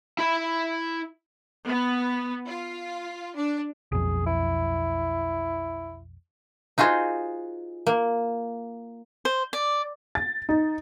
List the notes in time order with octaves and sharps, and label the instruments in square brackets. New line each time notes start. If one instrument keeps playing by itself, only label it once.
[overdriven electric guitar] E4 B5
[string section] B3
F4
D4
[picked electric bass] B1 F2 [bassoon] G#4
[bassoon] E4
[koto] D#4 F4 F#4 G#4 C5
A#3
[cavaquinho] C5
D5
[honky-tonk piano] A6
D#4